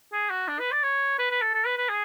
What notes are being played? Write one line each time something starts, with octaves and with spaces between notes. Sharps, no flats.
G#4
F#4
D4
B4
D5
C#5
B4
B4
A4
A4
B4
B4
G#4